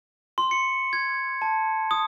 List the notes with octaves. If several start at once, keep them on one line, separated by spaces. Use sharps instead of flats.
C6
C#7
G#6
A5
D#6